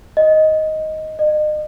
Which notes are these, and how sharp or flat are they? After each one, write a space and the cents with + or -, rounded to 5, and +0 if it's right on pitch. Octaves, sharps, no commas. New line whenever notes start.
D#5 +5
D#5 -40